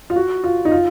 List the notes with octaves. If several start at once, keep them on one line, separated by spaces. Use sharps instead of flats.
F4
F#4
F4
D#4
F4